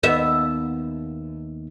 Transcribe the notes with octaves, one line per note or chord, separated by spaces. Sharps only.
D#2 B3 E5